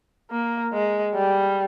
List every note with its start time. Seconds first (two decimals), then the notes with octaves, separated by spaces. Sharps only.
0.31 A#3
0.73 G#3
1.15 G3